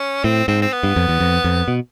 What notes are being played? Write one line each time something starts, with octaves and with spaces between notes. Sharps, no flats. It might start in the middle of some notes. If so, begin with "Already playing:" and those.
Already playing: C#4
A2 C4
G#2 C4
C4
B3
G2
F2
E2
F2
F2
B2